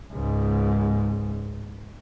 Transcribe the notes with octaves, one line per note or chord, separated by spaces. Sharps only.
C#2 G#2